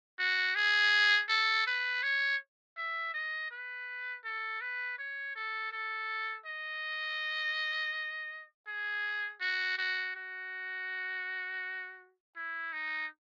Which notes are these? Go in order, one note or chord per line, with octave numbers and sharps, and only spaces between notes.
F#4
G#4
A4
B4
C#5
E5
D#5
B4
A4
B4
C#5
A4
A4
D#5
G#4
F#4
F#4
F#4
E4
D#4